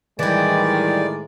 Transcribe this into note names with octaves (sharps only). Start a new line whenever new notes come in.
A2 D#3 E3 G3 G#3 D5